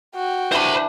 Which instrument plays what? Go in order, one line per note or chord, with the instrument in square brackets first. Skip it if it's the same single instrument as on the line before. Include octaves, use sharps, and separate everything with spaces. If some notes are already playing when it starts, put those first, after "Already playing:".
[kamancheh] F#4 G5
[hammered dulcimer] E3 D4 [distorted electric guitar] C5 B5